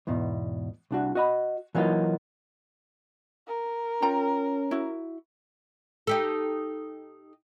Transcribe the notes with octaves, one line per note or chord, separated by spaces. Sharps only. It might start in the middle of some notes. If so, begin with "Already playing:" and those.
E2 G#2 B2
C2 D4 F#4
F#4 D#5 B5
E3 F#3 A#3 D#4 F4
A#4
C#4 F4 G5 A#5
E4 F#4
D#4 G4 A4